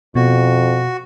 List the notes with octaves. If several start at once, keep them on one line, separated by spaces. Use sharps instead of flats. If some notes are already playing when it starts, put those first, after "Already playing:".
F2 B2 F#4